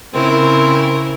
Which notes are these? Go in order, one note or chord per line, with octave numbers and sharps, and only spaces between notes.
C#3 C4 E4 A#4